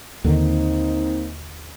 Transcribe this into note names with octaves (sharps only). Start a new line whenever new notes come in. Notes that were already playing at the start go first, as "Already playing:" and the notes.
D#2 D3 D#3 A#3 C4 D#4